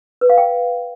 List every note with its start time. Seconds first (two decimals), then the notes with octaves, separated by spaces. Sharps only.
0.21 B4
0.30 F5
0.38 G5